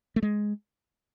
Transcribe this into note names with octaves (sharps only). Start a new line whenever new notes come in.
A3
G#3